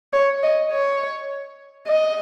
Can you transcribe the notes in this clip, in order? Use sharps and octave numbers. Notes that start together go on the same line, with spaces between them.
C#5
D#5
C#5
D#5